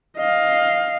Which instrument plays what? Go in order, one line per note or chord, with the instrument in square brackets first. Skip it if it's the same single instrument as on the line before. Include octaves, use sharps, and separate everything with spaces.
[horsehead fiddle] D#5 F5